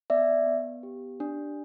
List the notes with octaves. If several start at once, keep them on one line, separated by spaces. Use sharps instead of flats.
B3 D5 E5
B3
G4
D4